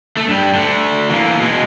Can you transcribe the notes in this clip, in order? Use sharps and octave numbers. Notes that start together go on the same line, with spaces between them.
A3
G2 G3
D3 A3
E3 A#3
B2 G#3